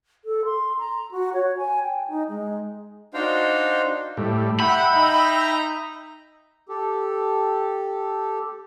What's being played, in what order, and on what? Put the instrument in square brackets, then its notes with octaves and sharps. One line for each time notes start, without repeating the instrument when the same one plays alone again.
[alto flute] A4
C6
A#5
F#4
C#5
G#5
G5
D#4
G#3
[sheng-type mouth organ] D4 D#4 F#4 C5 F5 G5
[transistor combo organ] A2 G3
[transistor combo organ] E5 G5 [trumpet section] F#5 [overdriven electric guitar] B5
[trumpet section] D#4 A#5
[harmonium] G4 A4